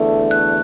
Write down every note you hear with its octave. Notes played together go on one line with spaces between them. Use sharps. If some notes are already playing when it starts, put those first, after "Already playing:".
Already playing: E2 D3 A3
F#6